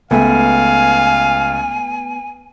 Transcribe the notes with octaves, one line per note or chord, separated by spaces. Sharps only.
C#2 A3 B3 F5 G#5